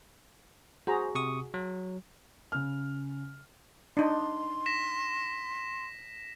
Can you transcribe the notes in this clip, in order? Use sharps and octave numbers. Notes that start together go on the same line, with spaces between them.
F#4 G#4 C5 A#5
C3 C#6 D#6
F#3
C#3 F6
D4 D#4 C6
A#6 B6 E7